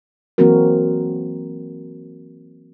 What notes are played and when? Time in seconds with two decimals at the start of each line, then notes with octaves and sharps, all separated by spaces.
0.38 E3 F#3 A#3 C4 F#4 A#4